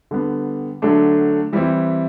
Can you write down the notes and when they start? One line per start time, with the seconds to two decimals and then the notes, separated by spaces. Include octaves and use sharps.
0.11 D3 G3 B3
0.82 D3 F#3 A3 D4
1.53 E3 G3 C4 E4